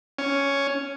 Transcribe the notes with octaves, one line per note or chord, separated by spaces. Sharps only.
C#4